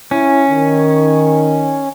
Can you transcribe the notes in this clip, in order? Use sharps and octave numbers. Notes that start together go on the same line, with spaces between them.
C#4 E4
D#3